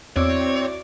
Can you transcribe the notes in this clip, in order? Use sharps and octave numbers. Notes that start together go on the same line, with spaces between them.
E2 C4 E4 F#4 C#5 D5 E6